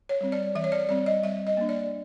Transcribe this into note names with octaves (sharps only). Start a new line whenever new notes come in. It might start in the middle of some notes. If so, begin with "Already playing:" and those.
C#5
G3 C4
D5
E3 E5
C#5
D5
G3 C4 D5
D#5
G3 E5
D#5
A#3 D4
D5